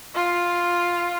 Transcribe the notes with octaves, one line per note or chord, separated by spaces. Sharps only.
F4